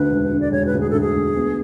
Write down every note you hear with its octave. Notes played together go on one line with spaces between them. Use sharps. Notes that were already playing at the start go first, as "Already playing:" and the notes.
Already playing: D2 D3 B4
E1
D3
D5
E1 C#5
B4
D2
G#4
D2 A4
G#4
D2
B3